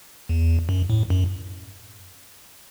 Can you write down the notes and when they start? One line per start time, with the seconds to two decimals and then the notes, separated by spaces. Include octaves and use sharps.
0.29 E2
0.69 F#2
0.90 A2
1.10 F#2